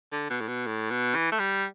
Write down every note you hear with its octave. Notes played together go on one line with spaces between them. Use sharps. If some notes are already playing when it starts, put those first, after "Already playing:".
D3
B2
A2
B2
A2
B2
E3
A3
G3